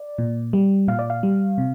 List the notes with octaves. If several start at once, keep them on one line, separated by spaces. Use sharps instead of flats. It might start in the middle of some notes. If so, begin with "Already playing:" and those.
Already playing: D5
A#2
G3
A#2 F5
D5
F5
G3
C3